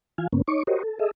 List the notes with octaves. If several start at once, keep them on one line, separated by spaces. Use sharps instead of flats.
E3 F4 F5 G#5
G2 C#3 A#3 B3 C#4
D#4 C#5 C#6 D6
F#4 G4 A#4 C5 C#5 D#5
A4
G#4 A4 D#5 E5